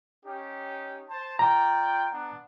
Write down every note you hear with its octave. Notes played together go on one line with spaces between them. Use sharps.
C#4 D#4 G4
C5 A5
F4 D5 G5 A#5
B3 D4 F#5